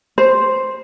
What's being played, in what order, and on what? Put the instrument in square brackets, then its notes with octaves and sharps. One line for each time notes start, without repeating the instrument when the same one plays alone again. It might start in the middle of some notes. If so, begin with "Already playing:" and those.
[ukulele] C5